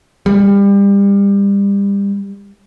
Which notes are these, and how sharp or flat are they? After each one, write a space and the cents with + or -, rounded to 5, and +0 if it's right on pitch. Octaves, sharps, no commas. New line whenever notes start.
G3 +30